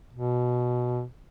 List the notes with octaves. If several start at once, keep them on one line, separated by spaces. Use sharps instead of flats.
B2